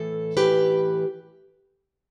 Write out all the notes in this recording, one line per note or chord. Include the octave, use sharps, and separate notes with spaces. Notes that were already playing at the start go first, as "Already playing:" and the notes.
Already playing: A2 E3 A4
A2 E3 G4 B4